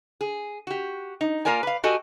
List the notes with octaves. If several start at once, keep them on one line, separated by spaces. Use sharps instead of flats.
G#4
F#4 G4
D#4
A#3 F4 A#4 D5 G#5
B4 F5
F#4 G4 A4 D#5 G#5